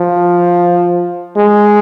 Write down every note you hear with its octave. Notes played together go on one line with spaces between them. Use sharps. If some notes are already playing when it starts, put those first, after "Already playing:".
Already playing: F3
G#3